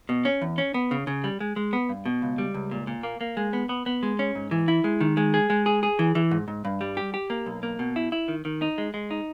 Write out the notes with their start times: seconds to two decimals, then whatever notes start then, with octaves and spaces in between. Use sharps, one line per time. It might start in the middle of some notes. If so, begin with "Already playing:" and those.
0.09 B2
0.25 C#4
0.42 E2
0.58 C#4
0.74 B3
0.91 C#3
1.07 C#3
1.24 G3
1.40 G#3
1.56 G#3
1.73 B3
1.89 G2
2.06 B2
2.22 C#2
2.38 G3
2.54 C#2
2.71 A#2
2.87 A#2
3.03 A#3
3.21 A#3
3.37 G#3
3.53 B3
3.69 B3
3.86 B3
4.03 G#3
4.19 C#4
4.35 G#2
4.51 E3
4.68 E4
4.84 G#3
5.01 D#3
5.17 G#3
5.34 G#4
5.50 G#3
5.66 G#4
5.83 G#4
5.99 E3
6.15 E3
6.31 G#2
6.48 G#2
6.65 G2
6.81 G3
6.97 G4
7.14 G4
7.30 A#3
7.46 B1
7.63 A#3
7.79 B2
7.96 E4
8.12 E4
8.28 D#3
8.45 D#3
8.62 D#4
8.78 G#3
8.94 G#3
9.11 D#4